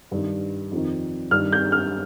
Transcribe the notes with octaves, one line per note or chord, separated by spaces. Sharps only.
G2 D#3
F2 D#3
G2 D#3 F6
G6
F6